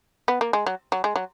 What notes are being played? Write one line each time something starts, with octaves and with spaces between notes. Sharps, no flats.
B3
A#3
G#3
F#3
F#3
G#3
F#3